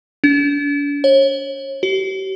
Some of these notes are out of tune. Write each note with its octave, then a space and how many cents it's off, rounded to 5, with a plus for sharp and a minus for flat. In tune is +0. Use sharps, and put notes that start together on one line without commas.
D4 -40
C#5 -35
G4 -45